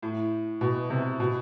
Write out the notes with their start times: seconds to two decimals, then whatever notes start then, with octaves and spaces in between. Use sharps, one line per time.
0.03 A2
0.61 B2
0.90 C3
1.20 B2